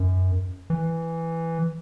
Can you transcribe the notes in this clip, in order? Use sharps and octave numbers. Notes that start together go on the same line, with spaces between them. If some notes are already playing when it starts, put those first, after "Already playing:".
Already playing: F#2
E3